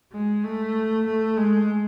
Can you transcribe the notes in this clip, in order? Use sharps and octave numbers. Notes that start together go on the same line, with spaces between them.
G#3
A3
A3
G#3